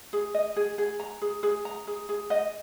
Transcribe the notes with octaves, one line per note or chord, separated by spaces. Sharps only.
G#4
D#5
G#4
G#4
A#5
G#4
G#4
A#5
G#4
G#4
D#5